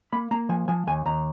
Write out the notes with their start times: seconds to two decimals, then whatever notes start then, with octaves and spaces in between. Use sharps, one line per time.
0.13 A#3 B5
0.31 A#3 A#5
0.49 F3 G#5
0.68 F3 G#5
0.87 D#2 G#5
1.06 D#2 A#5